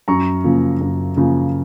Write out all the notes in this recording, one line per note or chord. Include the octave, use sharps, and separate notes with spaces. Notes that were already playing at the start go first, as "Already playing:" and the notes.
F#2 A#5 C#6
C#3 F3 A#3
F#2
C#3 F3 A#3